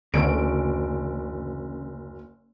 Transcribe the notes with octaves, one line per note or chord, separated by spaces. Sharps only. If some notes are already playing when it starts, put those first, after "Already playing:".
F#1 D2 C#3 E3 D7